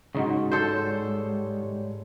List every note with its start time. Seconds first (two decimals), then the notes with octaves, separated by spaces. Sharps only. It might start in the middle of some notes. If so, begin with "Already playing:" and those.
0.15 C2 G#2 C#3 D#4 F#4
0.52 G3 G#3 A4 C5 C#5